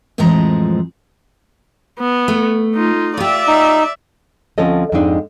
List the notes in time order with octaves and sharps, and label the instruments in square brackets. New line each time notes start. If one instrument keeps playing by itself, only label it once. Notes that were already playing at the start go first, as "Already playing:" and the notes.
[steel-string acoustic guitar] F2 A2 E3 F3 G#3 A#5
[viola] B3
[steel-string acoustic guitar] A3
[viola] D#4 F4
[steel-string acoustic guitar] F4 G4 [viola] D5 E5
[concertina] D#4
[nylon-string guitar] D2 F3 C4 C#4 A4 D#5
F2 G#2 G#3 C4 D4 D#4